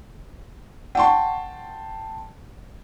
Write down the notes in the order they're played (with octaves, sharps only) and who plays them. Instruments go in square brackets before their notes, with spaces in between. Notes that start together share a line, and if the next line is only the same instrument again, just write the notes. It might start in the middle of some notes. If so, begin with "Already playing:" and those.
[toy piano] F#5 C#6 [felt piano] G5 A5 C6